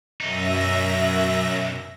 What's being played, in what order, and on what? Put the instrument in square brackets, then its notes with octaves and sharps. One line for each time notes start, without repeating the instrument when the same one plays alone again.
[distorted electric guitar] B1 D#4 [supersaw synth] F#2 E5 A#6